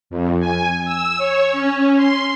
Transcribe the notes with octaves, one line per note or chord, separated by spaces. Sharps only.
F2
G#5
E6
C#5
C#4
C6